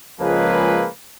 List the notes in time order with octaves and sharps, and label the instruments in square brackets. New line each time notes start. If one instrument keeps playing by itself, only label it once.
[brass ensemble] C#2 F3 G#3 A#3 G#4 B4